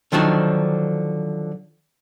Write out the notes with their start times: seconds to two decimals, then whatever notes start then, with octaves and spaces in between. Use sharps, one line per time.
0.12 D3 D#3 F3 F#3 D4 D#4